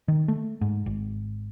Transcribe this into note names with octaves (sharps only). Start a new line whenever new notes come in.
D#3
A3
G#2
G#1